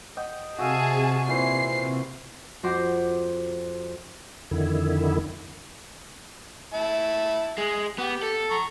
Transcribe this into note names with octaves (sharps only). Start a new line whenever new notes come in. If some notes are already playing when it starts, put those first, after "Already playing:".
D#5 F#5 G5
C3 F#4 G#4 E5 F5 A5
A#2 E3 C5 C7
F2 F#4 G5 C6 D6 A#6
F2 D3 D#3 E4
E4 A5
G#3
B3 G4
A4
A#5 C#6